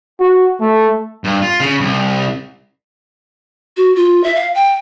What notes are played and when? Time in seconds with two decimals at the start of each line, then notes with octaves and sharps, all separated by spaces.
0.20 F#4
0.61 A3
1.24 G2
1.42 F4
1.60 C#3
1.80 C2
3.77 F#4
3.96 F4
4.24 E5
4.35 F5
4.55 G5